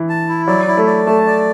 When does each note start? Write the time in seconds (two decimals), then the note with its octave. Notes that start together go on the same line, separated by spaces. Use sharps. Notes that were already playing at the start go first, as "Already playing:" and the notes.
Already playing: E3
0.09 A5
0.29 E4
0.47 F#3 D5
0.68 E4
0.77 A3
0.86 D5
1.06 A3 A5
1.27 D5